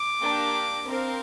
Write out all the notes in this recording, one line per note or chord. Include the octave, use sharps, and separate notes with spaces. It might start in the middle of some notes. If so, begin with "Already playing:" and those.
Already playing: D6
A#3 D4 G4 A#4
C4 A#4 F5